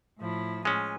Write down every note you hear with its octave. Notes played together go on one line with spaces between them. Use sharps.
A2 F3 E4
G#3 C#4 G#5